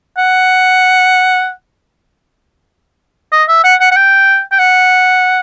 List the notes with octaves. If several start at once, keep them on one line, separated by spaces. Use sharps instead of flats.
F#5
D#5
E5
F#5
F#5
F#5
G5
G5
F#5